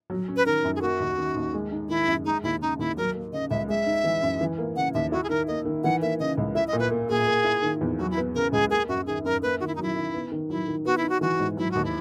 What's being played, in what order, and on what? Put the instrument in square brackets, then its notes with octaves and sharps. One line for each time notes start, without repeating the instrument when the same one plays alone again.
[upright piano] F#3
C#4
[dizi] B4
[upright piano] D#3 [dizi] A#4
[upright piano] F#2
[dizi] G#4
[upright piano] A#3 [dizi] F#4
[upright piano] D#2
D#3
D#2
G#3
D#4
[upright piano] D#3 [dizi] E4
[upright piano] F#2
[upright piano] G#3 [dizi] D#4
[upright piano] D#2 [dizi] E4
[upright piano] C#3 [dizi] D#4
[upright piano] D#2 [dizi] E4
[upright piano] F#3 [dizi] A#4
[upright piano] A#3
[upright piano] C#3 [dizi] D#5
[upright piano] C#2 [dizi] E5
[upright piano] G#3 [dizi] E5
[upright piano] D#4
E3
F#2
E3
A#3
[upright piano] C#3 [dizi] F#5
[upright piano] D#2 [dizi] E5
[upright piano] E4 [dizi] F#4
[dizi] G#4
[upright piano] D#3 [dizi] A#4
[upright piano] A#3 [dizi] D#5
[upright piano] D#3
[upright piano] E3 [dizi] F#5
[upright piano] A#3 [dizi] E5
[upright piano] C#3 [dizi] D#5
[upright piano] C#2
[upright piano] E4 [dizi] E5
[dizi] D#5
[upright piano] A#2
[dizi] B4
[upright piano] A#3
[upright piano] A#2 [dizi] G#4
[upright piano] A#3
E4
D#3
E2
[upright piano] F#3 [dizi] F#4
[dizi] E4
[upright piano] B3
[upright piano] C#3 [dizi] A#4
[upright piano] C#2 [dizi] G#4
[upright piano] A#3 [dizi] G#4
[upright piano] F#2 [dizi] F#4
[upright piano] D#3 [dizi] G#4
[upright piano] F#2 [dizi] A#4
[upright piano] A#3 [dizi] B4
[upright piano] D#3 [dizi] F#4
[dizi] E4
D#4
[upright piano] F#3 [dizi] E4
[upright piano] D#3
B3
D#3
[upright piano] F#3 [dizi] E4
[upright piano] D#3
[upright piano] B3 [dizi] F#4
[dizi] E4
[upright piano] D#4
[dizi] F#4
[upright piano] E3 [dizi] F#4
[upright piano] G#2
[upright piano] F#3 [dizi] E4
[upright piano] D#2 [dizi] F#4
[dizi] E4